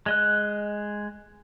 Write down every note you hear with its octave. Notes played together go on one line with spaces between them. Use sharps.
G#3 D#5 F#6